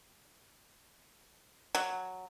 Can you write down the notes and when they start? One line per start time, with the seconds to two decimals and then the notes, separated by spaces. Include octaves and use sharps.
1.75 F#3